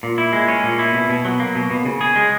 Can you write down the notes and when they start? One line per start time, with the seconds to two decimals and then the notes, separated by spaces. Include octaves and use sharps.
0.03 A#2
0.18 E4
0.33 G#3
0.48 C#4
0.63 A#2
0.79 E4
0.94 B2
1.09 B2
1.25 F#3
1.40 A#3
1.55 B2
1.70 B2
1.85 C#3
2.01 G#4
2.16 G#3